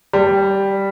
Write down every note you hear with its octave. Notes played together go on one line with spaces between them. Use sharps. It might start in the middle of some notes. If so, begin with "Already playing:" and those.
G3